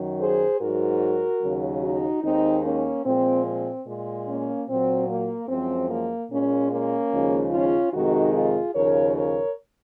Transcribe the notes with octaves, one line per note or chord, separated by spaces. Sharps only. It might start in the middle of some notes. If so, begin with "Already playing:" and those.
Already playing: F#2 D#3 F#3
G#4 C5
G#2 F#3 F#4 A#4
D#2 C#3 F#3
D#4 F#4
D#2 D#3 G#3 C4 D#4
A#3 C#4
A#2 F3 G#3 C4
C4
A#2 G#3
A#3 C#4
A#2 F#3 C4
A#3
F#2 F3 G#3 C4
A#3
A#2 G#3 A#3 C#4
A#3 C#4
D#2 C#3 F3 G#3
C#4 F4
F2 C3 D#3 G#3 D#4 F#4
F4 G#4
D#2 C#3 F3 A#4 C#5
A#4 C#5